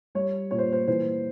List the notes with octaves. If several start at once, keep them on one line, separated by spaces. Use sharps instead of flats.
G3 C#5
A#2 C#5
C5
C5
E3 C5